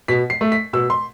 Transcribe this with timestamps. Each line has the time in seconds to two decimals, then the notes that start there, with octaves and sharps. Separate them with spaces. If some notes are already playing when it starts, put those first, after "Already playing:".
0.08 B2 B6
0.30 C7
0.41 A3
0.52 B6
0.73 B2 E6
0.90 C6